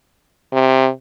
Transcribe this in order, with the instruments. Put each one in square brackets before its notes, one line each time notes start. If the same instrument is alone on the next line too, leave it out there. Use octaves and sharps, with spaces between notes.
[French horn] C3